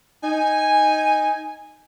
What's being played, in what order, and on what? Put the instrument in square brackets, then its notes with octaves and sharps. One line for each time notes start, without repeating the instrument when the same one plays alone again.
[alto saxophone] D#4 [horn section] G#5